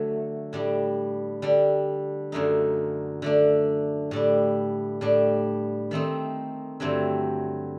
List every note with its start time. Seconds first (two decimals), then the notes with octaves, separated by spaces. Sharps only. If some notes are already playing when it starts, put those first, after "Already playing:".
Already playing: D3 F#3 A3
0.53 A2 G3 D4
1.42 D3 G3 D4
2.32 F#2 D3 A3 D#4
3.22 D3 A3 D4
4.11 A2 G3 D4
5.01 A2 G3 D4
5.91 D#3 A3 C4 D#4
6.80 G2 D3 F#3 A3 C4